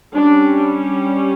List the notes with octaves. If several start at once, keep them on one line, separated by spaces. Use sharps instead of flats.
G3 C#4 D4